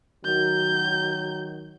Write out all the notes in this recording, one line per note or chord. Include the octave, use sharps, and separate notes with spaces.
D#3 F#3 G6